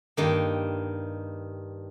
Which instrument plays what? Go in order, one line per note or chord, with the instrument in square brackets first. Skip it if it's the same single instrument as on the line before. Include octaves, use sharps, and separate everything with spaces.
[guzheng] G2 D#3 A#3